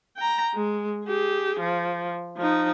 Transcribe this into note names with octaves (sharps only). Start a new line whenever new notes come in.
G5 A#5
G#3
G4 G#4
F3
F3 D#4